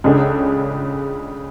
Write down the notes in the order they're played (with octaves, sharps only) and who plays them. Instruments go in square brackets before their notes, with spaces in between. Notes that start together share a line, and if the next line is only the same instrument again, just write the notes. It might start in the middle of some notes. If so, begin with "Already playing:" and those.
[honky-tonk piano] C#2 C#3 G#3 D4 A4